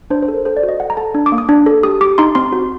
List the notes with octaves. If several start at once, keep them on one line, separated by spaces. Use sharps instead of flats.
D4 C5
C5
A4
A#4
A4 C5
D5
F#4
D#5
A4 F#5
A#5
A4 A5
D4
D6
A#3
D#6
D4
A4
G4 D#6
G4 D6
D#4 C6
C4 C6
F#4